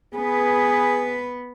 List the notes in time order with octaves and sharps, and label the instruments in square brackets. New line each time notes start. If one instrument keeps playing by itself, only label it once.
[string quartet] B3 B4 [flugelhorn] G#4